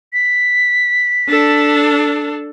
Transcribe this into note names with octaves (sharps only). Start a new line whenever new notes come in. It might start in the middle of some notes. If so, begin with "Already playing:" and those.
B6
D4 A4